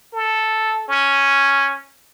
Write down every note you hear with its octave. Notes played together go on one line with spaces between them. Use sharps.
A4
C#4